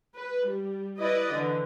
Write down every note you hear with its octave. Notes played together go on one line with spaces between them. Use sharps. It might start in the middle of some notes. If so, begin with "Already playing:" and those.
B4
G3
E4 B4 D5 D#5
D3 E3